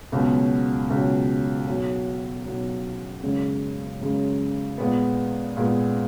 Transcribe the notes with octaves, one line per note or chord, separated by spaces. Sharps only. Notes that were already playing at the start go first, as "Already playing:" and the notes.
C#2 B2 F#3
C#2 B2 F#3
B1 B2 F#3
B1 B2 F#3
F#2 C#3 G#3
F#2 C#3 G#3
A#2 G#3 B3
A#2 G#3 B3